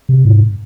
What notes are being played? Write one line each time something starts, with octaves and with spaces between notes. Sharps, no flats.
C3
G#2